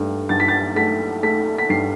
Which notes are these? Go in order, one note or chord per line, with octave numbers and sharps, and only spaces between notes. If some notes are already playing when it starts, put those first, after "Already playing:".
Already playing: G2 A3
G2 A6
B6
A6
A3 B6
A3 B6
B6
G2 C7